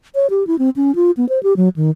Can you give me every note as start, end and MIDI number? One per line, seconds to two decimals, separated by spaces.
0.15 0.27 73
0.30 0.46 67
0.47 0.58 64
0.59 0.70 60
0.76 0.94 61
0.95 1.11 65
1.17 1.28 59
1.29 1.41 72
1.43 1.56 67
1.57 1.69 54
1.76 1.91 51